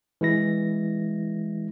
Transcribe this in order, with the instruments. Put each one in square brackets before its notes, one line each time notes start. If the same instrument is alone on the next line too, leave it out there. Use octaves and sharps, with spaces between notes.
[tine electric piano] E3 G#3 E4 A#6